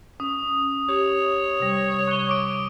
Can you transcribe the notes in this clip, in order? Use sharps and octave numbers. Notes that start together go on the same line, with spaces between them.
C#4 D#6
G4 C#5
C3 G3
C#6 F#6 G7
D6 D7